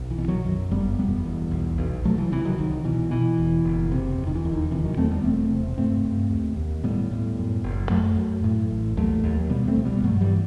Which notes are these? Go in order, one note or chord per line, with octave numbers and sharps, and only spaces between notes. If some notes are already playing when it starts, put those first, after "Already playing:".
Already playing: B1
E3
B2
D#3 F#3
F#2
G1 G3 B3
E1 G3 B3
E2
B1
B1
C2 F#3 A3
E3
C3 E3
D#3 F#3
C2 D#3
B2 E3
B2 E3
E1
F#1
C3
E1
D#3
E3
D#2
D#3
C3 E3
D#3 F#3
E2 A3 C4
G3 B3
E1 A3 C4
C3
G2 A3 C4
G2
D#2
D#2
A2 G3 B3
A2
F#2
F#1
F#2 F#3 A3
F#2
A2
A1
D#2 F#3 A3
D#2
B2 G3 B3
A3 C4
C2
G3 B3
G2 F#3 A3
E3 G3